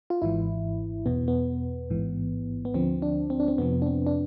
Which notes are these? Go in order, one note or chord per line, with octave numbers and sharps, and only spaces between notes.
F4
G#1 G#2 E3 E4
E2 B2 B3
B3
A1 G#2 E3
B3
D2 D3 F3 C4
D4
C4
D4
C4
F2 C3 F3 B3
D4
C4
D4